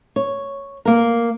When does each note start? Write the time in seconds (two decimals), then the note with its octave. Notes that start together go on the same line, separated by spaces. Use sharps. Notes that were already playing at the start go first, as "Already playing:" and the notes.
0.16 C#5
0.85 A#3 A#4